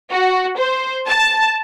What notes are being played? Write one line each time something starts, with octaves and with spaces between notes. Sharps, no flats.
F#4
C5
A5